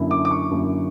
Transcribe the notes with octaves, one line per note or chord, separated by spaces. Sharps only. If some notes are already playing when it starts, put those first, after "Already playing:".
Already playing: F#2 D3 A#3 E4
D6
D6
C#6
F#2 D3 A#3 E4